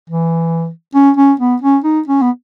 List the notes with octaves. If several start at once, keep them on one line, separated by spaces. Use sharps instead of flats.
E3
C#4
C#4
B3
C#4
D#4
C#4
B3